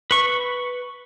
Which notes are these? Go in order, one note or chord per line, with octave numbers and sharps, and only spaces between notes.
B4 C#6